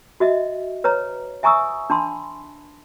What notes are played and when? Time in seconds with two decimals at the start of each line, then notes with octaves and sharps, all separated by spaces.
0.20 F#4 D#5 E5
0.84 B4 C#5 A#5
1.43 E5 G#5 A#5 C#6 D#6 E6
1.90 D4 A5 B5 C6